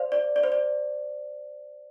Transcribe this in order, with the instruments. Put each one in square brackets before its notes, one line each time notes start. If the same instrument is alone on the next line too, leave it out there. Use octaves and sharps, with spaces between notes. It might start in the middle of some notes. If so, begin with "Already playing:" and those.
Already playing: [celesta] C5 D5 F5
D5
D5
C5
D5